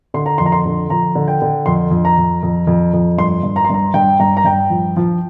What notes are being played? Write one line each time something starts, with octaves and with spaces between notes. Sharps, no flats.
D3 C6
A#5
F2 C6
A#5
C6
D3
F3 A#5
D3
G5
D3
F2 C6
F2
A#5
F2
F2
F2
F2
G2 C6
G2
A#5
C6
G2 A#5
G2 G5
G2 A#5
A#5
G2 G5
F3
F3